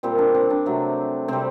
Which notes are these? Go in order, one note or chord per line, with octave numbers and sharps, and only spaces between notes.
A#2 G3 C4
D4
C4
D4
C3 F#3 A3
C3 G3 C4